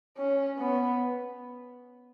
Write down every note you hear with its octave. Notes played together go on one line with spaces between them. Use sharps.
C#4
B3